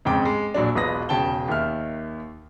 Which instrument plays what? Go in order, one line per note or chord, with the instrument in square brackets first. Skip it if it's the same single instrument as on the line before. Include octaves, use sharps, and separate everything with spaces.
[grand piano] F2 G#2 C#3 G5 D6
G#3
A#1 F#3 D4
E1 B1 F4 B4 D#6 A#6
E1 C#3 G5 A5 G7
D#2 D#3 E5 F6